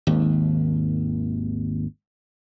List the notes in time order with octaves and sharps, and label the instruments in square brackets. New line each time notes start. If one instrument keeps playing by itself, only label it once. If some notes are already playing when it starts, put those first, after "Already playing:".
[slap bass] G#1 D#2